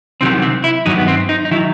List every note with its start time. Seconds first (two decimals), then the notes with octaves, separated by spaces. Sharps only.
0.21 C2 C3 D#3 F#3 C4
0.42 C4
0.64 E4
0.86 G2 D#3 F#3 D#4
0.98 B3
1.08 C4
1.29 D#4
1.45 D#4
1.51 D#3 F#3 E4